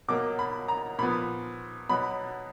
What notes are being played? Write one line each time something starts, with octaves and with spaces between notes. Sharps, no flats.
B2 F#3 A#3 D6
B5
A#5
A#2 F3 B3 B5
B2 F#3 B3 B5